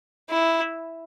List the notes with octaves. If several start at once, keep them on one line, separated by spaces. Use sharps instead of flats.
E4